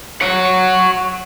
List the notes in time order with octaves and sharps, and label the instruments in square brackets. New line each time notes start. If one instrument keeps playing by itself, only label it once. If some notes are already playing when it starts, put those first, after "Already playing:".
[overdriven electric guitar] C#5 F#5